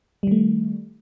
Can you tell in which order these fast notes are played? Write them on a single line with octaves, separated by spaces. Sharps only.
G3 D#3 A3